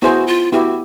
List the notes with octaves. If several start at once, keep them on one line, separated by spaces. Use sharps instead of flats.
B3 E4 F#4 G#4 C5
F4
B3 E4 F#4 G4